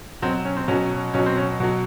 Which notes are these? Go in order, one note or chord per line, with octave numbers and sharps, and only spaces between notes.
B2 F#3 C4
C#4
C4
B2 F#3 C#4
B2 F#3 C#4
C4
C#4
B2 F#3